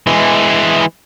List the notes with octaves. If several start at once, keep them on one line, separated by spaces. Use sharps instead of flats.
E3 G#3